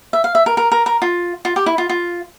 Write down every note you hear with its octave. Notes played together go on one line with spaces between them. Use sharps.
E5
F5
E5
A#4
A#4
A#4
A#4
F4
F4
G4
E4
F4
F4